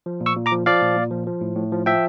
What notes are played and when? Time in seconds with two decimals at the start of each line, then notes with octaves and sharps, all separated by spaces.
0.06 F3
0.21 A#2
0.26 C#6 E6
0.36 A#2
0.46 A#5 D6
0.52 F3
0.66 F3 D5 F5
0.82 A#2
0.97 A#2
1.11 F3
1.27 F3
1.41 A2
1.56 A2
1.72 F3
1.86 F3 E5 G5